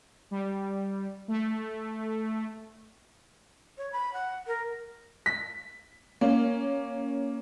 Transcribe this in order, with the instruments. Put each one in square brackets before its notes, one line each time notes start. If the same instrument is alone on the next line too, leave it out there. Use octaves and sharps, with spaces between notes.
[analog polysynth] G3
A3
[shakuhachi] C#5
B5
F#5
A#4
[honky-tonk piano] B6
A#3 C#4